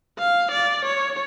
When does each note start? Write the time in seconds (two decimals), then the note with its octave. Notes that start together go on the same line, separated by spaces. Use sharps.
0.19 F5
0.51 D5
0.85 C#5